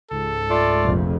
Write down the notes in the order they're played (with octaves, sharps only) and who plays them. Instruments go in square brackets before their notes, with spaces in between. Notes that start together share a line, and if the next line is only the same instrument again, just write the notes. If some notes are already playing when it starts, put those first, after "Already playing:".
[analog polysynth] C#2 G#2 [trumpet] A4
[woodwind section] A3 F4 D5
[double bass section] F1 A#1 F2